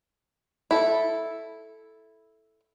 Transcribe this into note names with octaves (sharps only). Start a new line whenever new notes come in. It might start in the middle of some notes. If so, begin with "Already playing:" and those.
E4 A4